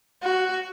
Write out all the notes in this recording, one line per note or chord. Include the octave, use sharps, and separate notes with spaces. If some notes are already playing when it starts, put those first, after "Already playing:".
F#4